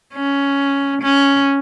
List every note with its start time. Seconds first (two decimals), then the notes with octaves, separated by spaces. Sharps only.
0.13 C#4
1.02 C#4